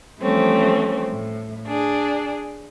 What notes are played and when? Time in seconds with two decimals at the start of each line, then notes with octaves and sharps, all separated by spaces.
0.20 E3 F3 G3 A3 C4 C#4
1.10 A2
1.66 D4 G#4